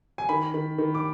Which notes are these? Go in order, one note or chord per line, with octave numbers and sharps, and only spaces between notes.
G#5
D#3 B5
D#3
D#3
D6